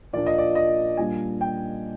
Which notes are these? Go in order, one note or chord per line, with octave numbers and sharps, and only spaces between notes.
A#2 F3 A#3 D4 D5
D#5
D5
D#5
A#2 G3 A#3 D4 G#5
G5